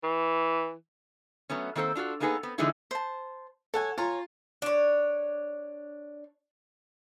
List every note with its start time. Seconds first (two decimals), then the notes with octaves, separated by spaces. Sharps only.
0.03 E3
1.50 F#3 A3 B3 C#4
1.75 D#3 A#3 C4 A4 C5
1.95 D4 F4 F#4 A4
2.20 A#3 B3 D#4 G#4 A4 B4
2.43 B3 C4
2.58 D3 E3 F3 G#3 D#4 E4
2.91 C5 A5
3.74 A4 C#5 F#5 G#5
3.98 F4 C#5 G#5 A#5
4.62 D4 C#5